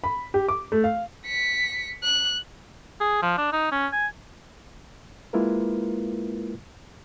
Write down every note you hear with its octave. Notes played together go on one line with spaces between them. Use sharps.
B5
G4
D6
A3
F5
B6 C#7
F#6
G#4
F3
D4
D#4
C#4
G#5
G#3 A#3 E4 F4 A#4 B4